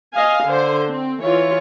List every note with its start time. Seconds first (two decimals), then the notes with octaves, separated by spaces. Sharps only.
0.13 D#5 F5 G#5
0.45 D3 C5
0.88 C4
1.21 E3 F4 C#5